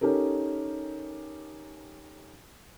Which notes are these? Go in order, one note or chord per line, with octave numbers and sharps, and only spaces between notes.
C#4 D#4 G4 A4 A#4